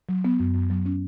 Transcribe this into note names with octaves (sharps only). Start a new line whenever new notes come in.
F#3
B3
F#2
F#2
F#3
C#4